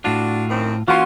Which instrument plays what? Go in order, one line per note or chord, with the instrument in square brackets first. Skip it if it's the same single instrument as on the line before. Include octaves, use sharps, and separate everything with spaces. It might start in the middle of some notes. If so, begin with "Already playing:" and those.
[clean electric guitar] A2 F4 [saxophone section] D4 F#4
[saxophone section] F#2 D#3 C4
[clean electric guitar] E3 A#3 C#4 [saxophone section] F4 [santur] F#4 C6